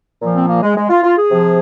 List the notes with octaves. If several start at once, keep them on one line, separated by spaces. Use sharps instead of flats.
A#2 F3
C4
A#3
G#3
G#3
F4
F4
G#4
C3 F3